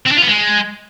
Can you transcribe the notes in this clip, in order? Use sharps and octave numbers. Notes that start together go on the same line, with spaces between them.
C4
D4
F4
B3
G#3